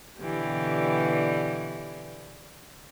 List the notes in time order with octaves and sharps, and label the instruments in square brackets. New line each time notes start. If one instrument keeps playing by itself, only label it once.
[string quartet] B2 D3 E3 G3 G4